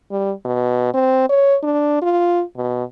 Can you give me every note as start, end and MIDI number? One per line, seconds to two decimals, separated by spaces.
0.11 0.32 55
0.45 0.93 47
0.94 1.28 60
1.30 1.57 73
1.63 1.97 62
2.02 2.43 65
2.57 2.84 47